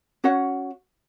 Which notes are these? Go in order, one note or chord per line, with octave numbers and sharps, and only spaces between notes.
C#4 F#4 C#5 F#5